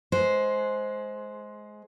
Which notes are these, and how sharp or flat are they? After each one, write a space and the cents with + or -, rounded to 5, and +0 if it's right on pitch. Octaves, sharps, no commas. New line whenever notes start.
G#3 +20 C5 +0